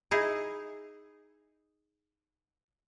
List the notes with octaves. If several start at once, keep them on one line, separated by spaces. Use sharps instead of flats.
D#4 E4 G#4